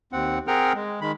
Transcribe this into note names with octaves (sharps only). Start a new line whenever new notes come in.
D#2 C4 F#5
C4 G#4 A#4 F#5 G5 F6
G#3
D#3 G#3 B5